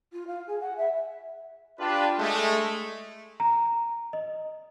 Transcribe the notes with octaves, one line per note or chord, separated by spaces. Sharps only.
F4
F5
G#4
F#5
E5
D4 F4 G4 B4
G#3 A3
A#5
D#5